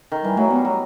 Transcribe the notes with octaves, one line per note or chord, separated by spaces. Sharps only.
D#3
E3 G3
F#3 A3
G3 B3
F#3